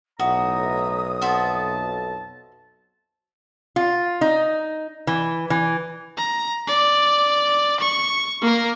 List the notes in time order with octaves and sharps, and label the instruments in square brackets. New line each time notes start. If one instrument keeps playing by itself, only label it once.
[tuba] B1 [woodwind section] A2 E5 A#5 [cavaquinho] F#4 [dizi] D#6
[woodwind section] F2 A5 [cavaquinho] F#4 C5 E5
[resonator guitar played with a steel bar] F4
D#4
E3
E3
[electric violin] A#5
D5
C#6
A#3 A#4